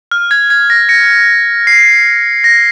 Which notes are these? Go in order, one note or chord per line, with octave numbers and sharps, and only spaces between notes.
F6
G#6
G#6
A#6
A#6 C#7
C7
A#6